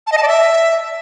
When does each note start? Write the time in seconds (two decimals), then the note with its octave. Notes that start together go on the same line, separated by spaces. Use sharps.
0.07 A5
0.12 D#5
0.17 A5
0.23 D5
0.28 E5